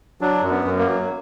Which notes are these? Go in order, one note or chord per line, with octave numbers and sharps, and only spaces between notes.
F#3 D4
F#2
B3
F#2
A#3
F#3